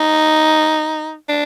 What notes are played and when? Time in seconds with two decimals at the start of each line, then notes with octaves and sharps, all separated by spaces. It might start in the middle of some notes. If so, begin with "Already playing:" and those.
Already playing: D#4
1.29 D4